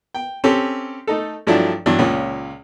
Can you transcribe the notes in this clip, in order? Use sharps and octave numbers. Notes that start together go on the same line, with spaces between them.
G5
C4 C#4 G4 A4
A3 D#4 A4
G2 F3 F#3 A3 D4 E4
G2 E3 F#3 D4
C#2 A#2 C#4